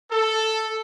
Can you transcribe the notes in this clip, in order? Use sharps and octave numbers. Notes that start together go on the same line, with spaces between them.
A4